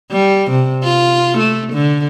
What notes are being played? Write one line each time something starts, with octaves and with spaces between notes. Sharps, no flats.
G3
C3
F4
A3
D3